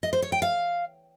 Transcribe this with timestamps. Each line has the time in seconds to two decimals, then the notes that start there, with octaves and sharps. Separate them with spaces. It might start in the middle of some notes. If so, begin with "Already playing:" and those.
0.03 D#5
0.13 C5
0.22 C#5
0.32 G5
0.42 F5